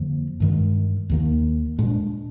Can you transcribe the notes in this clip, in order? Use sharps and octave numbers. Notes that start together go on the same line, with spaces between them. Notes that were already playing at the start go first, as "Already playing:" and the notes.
Already playing: F2 D3 F3 A#3
G2 D#3 G#3
D#2 D#3 A#3
A#2 G#3 D4